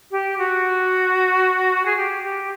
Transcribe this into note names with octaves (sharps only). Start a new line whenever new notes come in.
G4
F#4
G#4
G4
G4